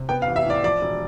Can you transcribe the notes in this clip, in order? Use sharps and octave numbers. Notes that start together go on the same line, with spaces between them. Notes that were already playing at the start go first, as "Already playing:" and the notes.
Already playing: C3
B3 G5
F5
A1
E5
A2 D5
F3 D5
E1